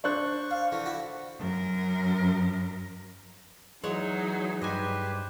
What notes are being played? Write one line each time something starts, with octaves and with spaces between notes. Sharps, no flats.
D4 C5 C#6 F#6
F5
D3 E3
E4 F#4
F#2 A#4
E3 F#3 G#3 D#4 G#4 C#5 F#5
G2 G4 B4 C5 D#5 G#5